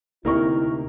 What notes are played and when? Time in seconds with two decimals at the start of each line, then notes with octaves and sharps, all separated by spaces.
0.25 D2 C3 A#3 D#4 E4 A#4 C#6